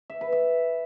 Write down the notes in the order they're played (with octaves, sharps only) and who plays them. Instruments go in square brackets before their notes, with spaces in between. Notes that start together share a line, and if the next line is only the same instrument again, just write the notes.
[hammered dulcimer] E5
B4
E5